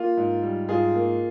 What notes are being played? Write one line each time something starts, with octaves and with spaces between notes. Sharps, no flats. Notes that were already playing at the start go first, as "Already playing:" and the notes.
Already playing: A#3 F4
G#2
G3
G#2 F4 G#4
A#3